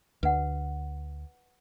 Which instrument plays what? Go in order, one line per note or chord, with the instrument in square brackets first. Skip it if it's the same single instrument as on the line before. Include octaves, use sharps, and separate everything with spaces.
[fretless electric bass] D2 [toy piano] B4 F#5